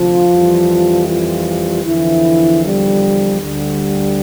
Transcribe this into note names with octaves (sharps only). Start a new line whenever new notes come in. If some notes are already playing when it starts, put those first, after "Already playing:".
Already playing: D2 C3 F3 F4
F2 E3 G3
F3 F4
E2 D3 E3 F3 E4
G3
D2 D3 G3